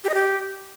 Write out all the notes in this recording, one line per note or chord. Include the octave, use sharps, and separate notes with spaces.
G4
D#5
G4